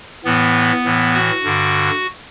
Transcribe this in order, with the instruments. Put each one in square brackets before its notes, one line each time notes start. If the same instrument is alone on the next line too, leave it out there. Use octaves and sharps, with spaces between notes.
[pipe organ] A2 E3 B3
A2 E3
F#4
G2 D3